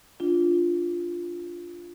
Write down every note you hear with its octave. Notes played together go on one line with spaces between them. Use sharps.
D4 F4